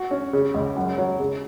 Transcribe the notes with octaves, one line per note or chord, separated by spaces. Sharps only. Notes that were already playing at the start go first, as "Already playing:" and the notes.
Already playing: F#4
C#4
C#3
C#2
F#2
F#3
C#3